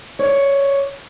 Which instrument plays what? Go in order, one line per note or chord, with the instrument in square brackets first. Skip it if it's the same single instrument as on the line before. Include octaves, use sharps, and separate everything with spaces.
[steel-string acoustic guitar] C#5 D5